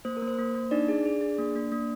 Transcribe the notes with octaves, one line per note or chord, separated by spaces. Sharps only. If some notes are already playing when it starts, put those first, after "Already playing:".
A#3 C5
A#4
A#3
C5
A#3
A#3
D4 D#4 D5
G#4
G#4
G#4
A#3
A#3
A#3